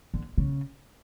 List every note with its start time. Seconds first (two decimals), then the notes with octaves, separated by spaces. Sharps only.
0.14 D3
0.38 C#3